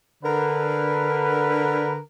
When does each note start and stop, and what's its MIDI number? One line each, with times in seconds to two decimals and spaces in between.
0.24 1.96 50
0.24 1.96 70
0.24 1.96 71